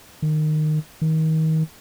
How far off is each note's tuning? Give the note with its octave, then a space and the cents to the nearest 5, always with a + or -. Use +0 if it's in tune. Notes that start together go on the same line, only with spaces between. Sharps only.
D#3 -20
D#3 +30